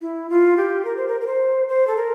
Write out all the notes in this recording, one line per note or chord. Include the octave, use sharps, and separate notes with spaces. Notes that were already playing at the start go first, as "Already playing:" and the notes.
E4
F4
G4
A#4
C5
A#4
A#4
C5
C5
A4
A#4